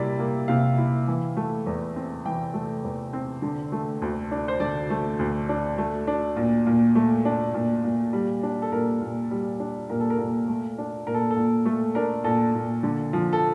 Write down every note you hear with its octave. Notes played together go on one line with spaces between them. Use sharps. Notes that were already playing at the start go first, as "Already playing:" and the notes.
Already playing: C3 G3 A#3 E4 D5
A#3
C3 F5
E4
E3
A3
E2
C4
E3 G5
A3
E2
C4
D3
A3
D2
D4
C5
D3 D5
A3
D2
D4
A3
D4
A#2
A#2
A3
D4
A#2
A#2
G3
D4
A4
A#2 A#4
A#2
G3
D4
A#2 A#4
A4
A#4
A#2
A3
D4
A#2 A#4
A4
A4
A#2
A3 A4
D4 A#4
A#2 A4
A#2
D3
F3
A4